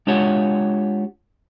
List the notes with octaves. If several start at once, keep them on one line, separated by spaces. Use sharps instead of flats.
G#3 D4 F4 G4 C#5 F#5